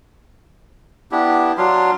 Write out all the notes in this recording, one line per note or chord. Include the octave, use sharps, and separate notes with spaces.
B3 D4 E4 G4
F#3 D4 F5 C6